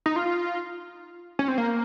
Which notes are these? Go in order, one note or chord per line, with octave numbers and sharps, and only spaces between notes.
D#4
F4
C#4
C4
A#3